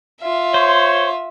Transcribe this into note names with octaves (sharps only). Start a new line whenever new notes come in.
F4 E5
C5 C#5